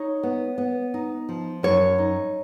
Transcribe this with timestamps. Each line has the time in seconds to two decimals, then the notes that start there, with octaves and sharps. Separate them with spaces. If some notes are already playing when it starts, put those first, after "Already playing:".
Already playing: D#4 C#5
0.23 B3
0.58 B3
0.94 D#4
1.29 F3
1.63 F#2 C#5
1.98 D#4